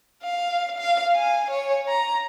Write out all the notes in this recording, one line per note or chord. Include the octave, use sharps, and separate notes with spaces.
F5
F5
G#5
C#5
A#5